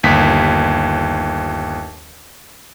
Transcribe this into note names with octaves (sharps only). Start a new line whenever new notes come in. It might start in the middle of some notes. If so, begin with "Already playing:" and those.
G1 D#2 B6